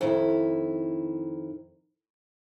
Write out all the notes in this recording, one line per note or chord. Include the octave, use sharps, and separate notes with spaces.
F2 D#3 E4